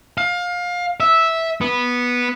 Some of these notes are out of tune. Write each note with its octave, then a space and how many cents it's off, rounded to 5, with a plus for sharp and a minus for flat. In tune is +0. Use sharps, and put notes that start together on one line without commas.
F5 +25
E5 -10
B3 -10